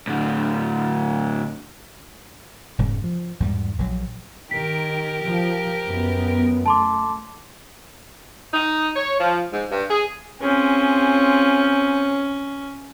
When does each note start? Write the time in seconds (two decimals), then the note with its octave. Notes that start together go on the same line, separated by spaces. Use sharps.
0.08 A2 D3
2.78 E1 G#2 C#3
3.04 F3
3.40 E2 G#2 G3
3.78 A#1 F#3
4.51 D#3 G4 A#4 B6
5.21 F3
5.87 F#2 B3
6.66 A3 A5 C6 D6
8.54 D#4
8.96 C#5
9.19 F3
9.53 G#2
9.71 G2
9.90 G#4
10.42 C4 C#4 F4 G#4